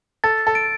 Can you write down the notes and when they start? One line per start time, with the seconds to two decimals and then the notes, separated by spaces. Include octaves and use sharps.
0.24 A4 A6
0.47 A4
0.55 D7